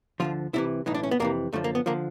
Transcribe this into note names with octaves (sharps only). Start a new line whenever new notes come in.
D2 D3 F3 F4
C2 C3 E3 E4
B1 A2 E3 D#4
D4
C#4
B3
F2 C3 E3 A#3
F#2 D3 F3 A3
A#3
B3
D3 F3 A#3